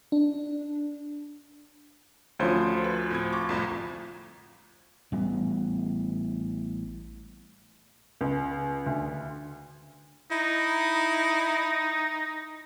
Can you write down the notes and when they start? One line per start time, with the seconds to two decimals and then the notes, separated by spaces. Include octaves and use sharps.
0.12 D4
2.39 D2 F3 C4 C#4 C5
2.84 B4
3.11 A2 C4 G#6
3.32 C#6 D6
3.49 C2 F2 A2
5.12 A1 G3 B3
8.21 C#2
8.86 D2
10.31 D#4 E4